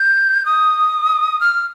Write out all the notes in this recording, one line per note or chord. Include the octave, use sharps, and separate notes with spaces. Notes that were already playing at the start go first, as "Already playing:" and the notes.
Already playing: G6
D#6
F6